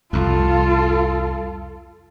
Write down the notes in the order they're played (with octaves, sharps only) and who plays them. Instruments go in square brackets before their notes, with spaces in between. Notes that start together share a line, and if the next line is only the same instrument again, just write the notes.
[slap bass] C2 F2 [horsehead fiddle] F4 A4